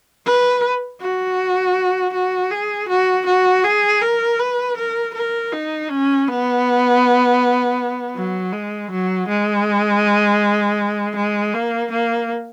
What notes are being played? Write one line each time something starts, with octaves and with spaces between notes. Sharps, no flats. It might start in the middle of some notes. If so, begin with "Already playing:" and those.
B4
F#4
F#4
G#4
F#4
F#4
G#4
A#4
B4
A#4
A#4
D#4
C#4
B3
F#3
G#3
F#3
G#3
G#3
A#3
A#3